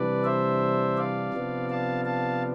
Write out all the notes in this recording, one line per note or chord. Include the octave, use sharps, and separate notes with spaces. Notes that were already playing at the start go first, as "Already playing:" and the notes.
Already playing: C3 E3 G3 D4 B4 D5
C5 E5
D5 F5
C3 F3 B3 D4
F5 A5
F5 A5